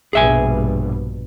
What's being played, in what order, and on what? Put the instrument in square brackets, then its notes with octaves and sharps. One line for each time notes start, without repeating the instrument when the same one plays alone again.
[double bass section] A#1 G2 B2 [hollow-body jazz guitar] G#4 E5 G#5